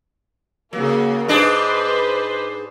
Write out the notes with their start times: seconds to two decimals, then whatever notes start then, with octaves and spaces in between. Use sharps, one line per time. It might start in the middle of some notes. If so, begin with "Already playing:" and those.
0.73 C#3 F#3 A#3
1.28 G#2 D4 G#4 B4 C5